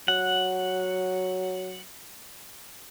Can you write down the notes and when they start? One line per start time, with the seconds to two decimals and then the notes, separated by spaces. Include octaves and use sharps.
0.08 F#3 F#5